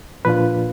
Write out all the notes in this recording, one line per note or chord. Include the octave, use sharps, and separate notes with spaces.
A#2 F3 A#3 D4 F4 B4